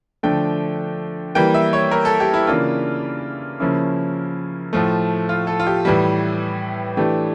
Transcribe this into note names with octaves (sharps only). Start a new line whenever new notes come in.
D3 F3 A3 D4 G5
E3 G3 A#3 G5
E5
C#5
A#4
A4
G4
E4
C#3 E3 A#3 D4 F4
C#3 F3 A#3 C#4 E4
A2 F3 A3
F4
A4
F4
G4
A2 E3 G3
E3 A3 D4 G4